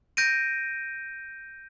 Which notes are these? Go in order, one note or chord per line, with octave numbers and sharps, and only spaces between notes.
G6 A#6 D7 D#7